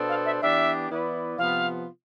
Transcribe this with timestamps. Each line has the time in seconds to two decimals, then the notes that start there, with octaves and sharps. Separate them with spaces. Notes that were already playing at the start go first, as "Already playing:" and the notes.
Already playing: B2 B3 D4 A4 C5
0.09 F5
0.25 E5
0.41 E3 B3 D4 G4 D5 E5
0.90 E3 B3 E4 B4 D5
1.38 C3 F3 B3 F4 F5